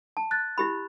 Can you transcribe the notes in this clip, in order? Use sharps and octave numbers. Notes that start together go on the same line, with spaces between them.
A5
F#6 A6
E4 G4 B5